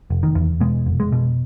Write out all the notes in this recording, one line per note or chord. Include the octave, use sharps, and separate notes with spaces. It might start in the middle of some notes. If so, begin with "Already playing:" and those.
F1
D#3
E2
B2 G#3
F1
G#3
B2